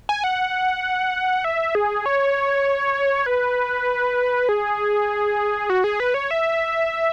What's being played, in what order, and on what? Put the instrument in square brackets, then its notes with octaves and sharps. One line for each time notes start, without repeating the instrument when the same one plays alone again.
[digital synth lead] G#5
F#5
E5
G#4
C#5
B4
G#4
F#4
G#4
B4
C#5
E5